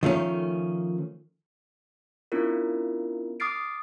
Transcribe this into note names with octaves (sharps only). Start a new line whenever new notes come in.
D#3 F3 A3 C#4
B3 C#4 D4 E4 F4 A#4
D6 D#6 F6 A6 C7 D7